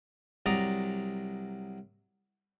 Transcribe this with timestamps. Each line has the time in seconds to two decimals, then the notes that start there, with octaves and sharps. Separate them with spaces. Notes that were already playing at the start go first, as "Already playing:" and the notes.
0.46 C2 F#3 D5 A#5 D#6